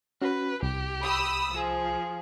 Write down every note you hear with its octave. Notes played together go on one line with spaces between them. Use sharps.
C#4 F#4 B4
C2 G4
B5 D#6 E6
F3 G#4